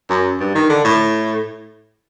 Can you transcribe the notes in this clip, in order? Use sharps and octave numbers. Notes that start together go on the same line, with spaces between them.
F#2
G2
D#3
D3
A2